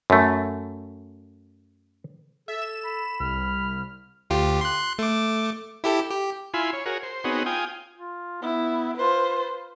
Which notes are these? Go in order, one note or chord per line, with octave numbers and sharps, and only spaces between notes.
F#2 A3
A4 E5
E7
B5
C2 F6
D2 F4 G4
C6 F#6
A3 D6
E4 G4 A4
G4
E4 F4 G#5 B5 C6
C#5
F#4 G#4 A#4 C#5
C5
B3 C4 D#4 F#4 G#4 C#5
F4 G5 G#5 D#6
F4
B3 E4
F4 B4 C5